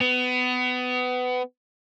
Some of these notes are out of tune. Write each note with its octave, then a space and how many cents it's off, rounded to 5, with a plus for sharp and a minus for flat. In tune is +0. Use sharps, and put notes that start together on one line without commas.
B3 +25